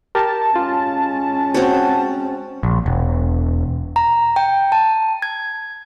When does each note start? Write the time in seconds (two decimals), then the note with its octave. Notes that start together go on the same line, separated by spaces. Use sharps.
0.15 G4 A#4 A5
0.56 G#3 C#4 F4
1.54 C4 F#4 C#5
2.63 A#1
2.86 E1
3.96 A#5
4.36 G5
4.72 A5
5.22 G#6